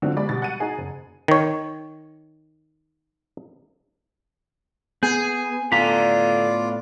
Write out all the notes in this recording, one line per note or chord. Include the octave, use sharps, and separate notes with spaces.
D3 F#3 C4 D4 F4 F#4
G3 G#3 D5 B5
B2 G3 A6
F#5 A6 D#7
D#4 F#4 G#4
F#1
D#3 C#5
B3 G#4 G6
A2 D3 B3 F4 D5 A#5 B6